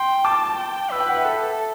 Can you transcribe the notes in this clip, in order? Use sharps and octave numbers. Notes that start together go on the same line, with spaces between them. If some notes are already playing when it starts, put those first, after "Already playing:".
Already playing: G5 C6
A5 D6
G5
B4 E6
G5
F#5
E5
A4